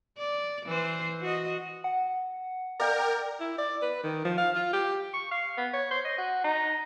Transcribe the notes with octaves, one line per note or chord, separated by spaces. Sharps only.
D5
E3 C5
F#4 D#5
F#5
A#4 D5 F5 G5
E4
D5
B4
D#3
F3
F5
F4
G4
C#6
F5
B3
C#5
C5
D#5
F#4
D#4